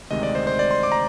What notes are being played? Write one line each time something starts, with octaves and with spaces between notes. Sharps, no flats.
D2 C3 D#3 G#3 D#5
D5
C5
C5
D5
C6
D6
A#5